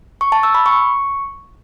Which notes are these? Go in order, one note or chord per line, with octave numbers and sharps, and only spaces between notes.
C#6
A5
E6
B5
C#6